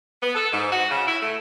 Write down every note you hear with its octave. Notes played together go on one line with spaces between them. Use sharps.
B3
A4
G#2
F#4
C#3
E4
A3